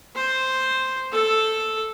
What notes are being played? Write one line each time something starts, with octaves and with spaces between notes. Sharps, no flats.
C5
A4